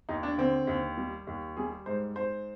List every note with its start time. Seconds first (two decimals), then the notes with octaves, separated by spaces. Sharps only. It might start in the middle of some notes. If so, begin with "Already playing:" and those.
0.09 D#2 D#4
0.23 D4
0.38 D3 C4
0.67 D#2
0.98 G3
1.27 D#2
1.57 G3 G#4
1.86 G#2 C5
2.16 G#2 C5